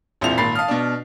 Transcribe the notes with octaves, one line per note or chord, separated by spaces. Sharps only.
E1 A#1 C4 E4 F4 F7
G#1 A#2 B5 A6 C7
F5 A5 D#6 F6
B2 D4